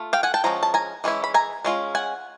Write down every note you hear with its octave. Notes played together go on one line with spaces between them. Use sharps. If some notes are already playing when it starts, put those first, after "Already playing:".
Already playing: A3 F4
F5 G5
F#5 G#5
G5 A5
F3 G#3 C#4 A#5
A5
G#5 A#5
E3 G#3 C#4 E4
B5
G#5 A#5
G#3 C#4 F4
F#5 G#5